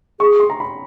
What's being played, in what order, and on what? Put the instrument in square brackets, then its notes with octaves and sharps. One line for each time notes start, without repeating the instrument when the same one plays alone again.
[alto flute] G#4 [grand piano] C#6
[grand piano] C6
A#5
B5